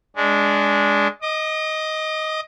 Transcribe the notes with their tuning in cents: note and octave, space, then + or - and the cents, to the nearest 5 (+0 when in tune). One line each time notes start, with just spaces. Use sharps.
G#3 +0 D4 -15
D#5 +10 D#6 -45